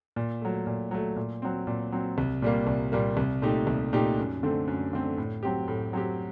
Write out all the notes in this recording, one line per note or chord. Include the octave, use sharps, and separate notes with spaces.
A#2
F#3 A3
A#2
F#3 A3
A#2
F#3 C4
A#2
F#3 C4
C2
A#2 G3 A#3
C2
A#2 G3 A#3
C2
A#2 A3 D#4 G4
C2
A#2 A3 D#4 G4
F#2
D3 A3 C4
F#2
D3 A3 C4
A2
F#3 C4 G4
A2
F#3 C4 G4